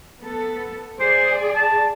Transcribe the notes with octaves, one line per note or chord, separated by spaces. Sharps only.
B3 A4
G#4 C5 D5
A5